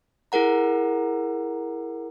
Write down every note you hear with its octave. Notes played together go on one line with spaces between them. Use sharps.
E4 G#4 A#4 F#5 A#5